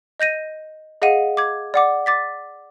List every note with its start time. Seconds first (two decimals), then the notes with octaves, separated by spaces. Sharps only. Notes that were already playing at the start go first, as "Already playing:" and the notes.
0.20 D#5 G6 A#6 D#7
1.02 G#4 D#5 F5 F#5 D#7
1.37 D6 G#6
1.74 D5 F#5 D6
2.06 D6 A6 B6